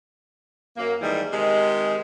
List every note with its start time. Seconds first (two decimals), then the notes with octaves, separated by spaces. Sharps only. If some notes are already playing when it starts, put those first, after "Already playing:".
0.77 F#2 A#3
1.01 G#2 D#3 E3 G3 G#3
1.32 C3 D#3 G#3